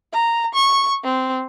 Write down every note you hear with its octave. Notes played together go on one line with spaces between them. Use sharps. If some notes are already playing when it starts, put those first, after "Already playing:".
A#5
C#6
C4